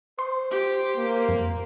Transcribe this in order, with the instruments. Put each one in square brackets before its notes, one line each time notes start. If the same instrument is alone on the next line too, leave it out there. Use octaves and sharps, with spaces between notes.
[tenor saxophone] C5 [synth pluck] C6
[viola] G4
[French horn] A#3
[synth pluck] F2